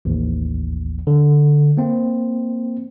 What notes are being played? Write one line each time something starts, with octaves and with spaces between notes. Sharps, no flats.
A1 D#2
D3
A#3 C4